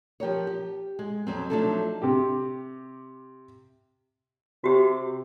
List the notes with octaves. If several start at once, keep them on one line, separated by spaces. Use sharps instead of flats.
F3 G4 A#4 C#5
G4
G#3
F2 F#3 C4
F3 F#3 A3 D4 D#4 A4
C3 G4
C3 F#4 G4